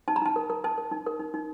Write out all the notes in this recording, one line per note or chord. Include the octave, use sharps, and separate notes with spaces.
D#4 A5
A#5
D#4 A5
A#4
A#4
A#4 A5
A#4
D#4
A#4
D#4
D#4